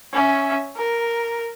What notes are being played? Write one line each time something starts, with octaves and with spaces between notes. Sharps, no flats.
C#4 E5
A#4